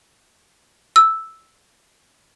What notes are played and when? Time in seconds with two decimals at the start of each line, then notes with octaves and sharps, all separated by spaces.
0.96 E6